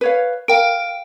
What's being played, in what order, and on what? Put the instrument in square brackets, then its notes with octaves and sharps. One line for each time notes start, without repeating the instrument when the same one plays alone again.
[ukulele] B4 C#5 F5
[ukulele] A#4 [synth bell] F5 G5 D7